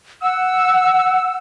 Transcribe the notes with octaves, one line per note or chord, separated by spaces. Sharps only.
F#5 E6